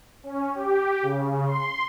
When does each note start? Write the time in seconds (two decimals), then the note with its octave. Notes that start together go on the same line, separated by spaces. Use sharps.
0.23 C#4
0.55 G4
1.03 C#3
1.46 C6